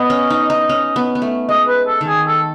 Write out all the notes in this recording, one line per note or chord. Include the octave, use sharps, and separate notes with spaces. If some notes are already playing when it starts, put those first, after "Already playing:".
Already playing: B3 D#5
C#4
D#4
D#4
C#4
B3
B3
A3
G#3 D#5
B4
A4
D#3
G#4
A4